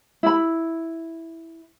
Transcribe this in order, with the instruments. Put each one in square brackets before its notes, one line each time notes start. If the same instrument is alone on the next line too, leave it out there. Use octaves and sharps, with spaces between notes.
[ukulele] E4 B5